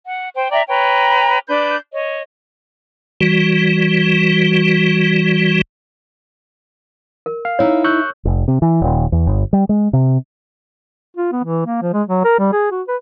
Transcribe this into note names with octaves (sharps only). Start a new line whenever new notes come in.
F#5
C5 G5
D5 E5 G5 A#5
B4 C#5 G5 A#5
D4 B4 D5 G6
C#5 D#5
E3 G3 F#4
A#4
F5
D#4 E4 C#5 E5
C#6 E6 F#6 G6
F1
C3
E3
D#1
E2
G1
G3
G#3
C3
F4
B3
E3
A#3
F3
G#3
F#3
A#4
G3
G#4
F#4
B4